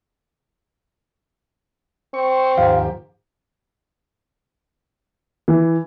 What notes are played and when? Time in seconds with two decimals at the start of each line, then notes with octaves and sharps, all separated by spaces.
2.14 C4 C#6
2.58 D#2 G#2 F3 G4 F5
5.48 E3